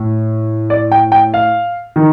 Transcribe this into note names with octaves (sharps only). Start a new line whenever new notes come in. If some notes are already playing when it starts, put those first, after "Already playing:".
Already playing: A2
D5
G5
G5
F5
D#3